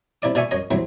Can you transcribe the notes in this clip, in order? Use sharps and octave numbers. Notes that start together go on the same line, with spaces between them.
C3 E4 D5 D6
B2 D5 E5 G#5 C#6
F#2 C#5 D#5 C6
D2 C3 E3 F#3 C4